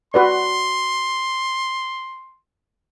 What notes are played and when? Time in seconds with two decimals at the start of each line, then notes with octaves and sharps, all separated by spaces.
0.14 F#4 B4 D5 C6